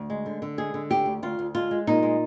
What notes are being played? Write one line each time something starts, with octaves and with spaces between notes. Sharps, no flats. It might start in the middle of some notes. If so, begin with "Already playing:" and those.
Already playing: D2
G#3
D3
D3
G#3 G#4
D3
D2 G4
D2
D2 F4
D2
G#3 F4
G#3
A#2 D#4
G#3